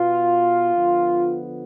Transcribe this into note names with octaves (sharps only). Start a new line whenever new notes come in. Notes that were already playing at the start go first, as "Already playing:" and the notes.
Already playing: B2 B3 F4
D3 F3 B3